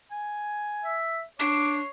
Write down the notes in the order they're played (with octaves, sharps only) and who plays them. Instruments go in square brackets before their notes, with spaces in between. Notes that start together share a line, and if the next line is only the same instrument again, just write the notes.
[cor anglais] G#5
[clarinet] E5
[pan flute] D4 [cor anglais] C#5 [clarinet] D6 [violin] C7